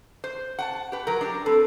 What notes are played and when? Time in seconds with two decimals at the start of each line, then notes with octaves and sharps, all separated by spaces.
0.24 C5
0.59 F#5 G5 A5
0.92 G4 B4
1.07 F#3 A#4
1.21 D4 G4
1.46 C4 A4 B4